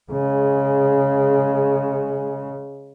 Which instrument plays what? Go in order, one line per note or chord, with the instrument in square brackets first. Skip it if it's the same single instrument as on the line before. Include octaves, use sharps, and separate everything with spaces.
[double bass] C#3 G#3